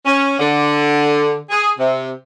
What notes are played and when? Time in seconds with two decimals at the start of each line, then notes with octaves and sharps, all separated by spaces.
0.06 C#4
0.39 D3
1.50 G#4
1.78 C3